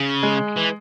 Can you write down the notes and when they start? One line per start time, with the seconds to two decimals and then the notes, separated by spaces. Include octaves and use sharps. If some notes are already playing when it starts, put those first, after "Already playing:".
Already playing: C#3
0.23 G#3
0.57 E3